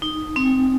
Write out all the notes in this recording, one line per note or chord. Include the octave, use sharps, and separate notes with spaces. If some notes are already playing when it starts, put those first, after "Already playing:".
D#4
C4